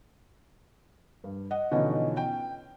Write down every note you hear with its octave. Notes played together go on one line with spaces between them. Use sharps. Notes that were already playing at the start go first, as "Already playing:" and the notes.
G2
D#5 F#5
B2 D3 E3 F3 C#4 D#4
G5